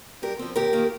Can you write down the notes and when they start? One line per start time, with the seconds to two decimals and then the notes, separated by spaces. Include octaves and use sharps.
0.22 G2 G4 A#4
0.39 F3 C4
0.56 D#2 G4 A#4
0.73 D#3 A#3 F4